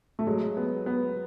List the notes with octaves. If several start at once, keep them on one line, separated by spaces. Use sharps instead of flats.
A3
F#3 G#3
B3
B3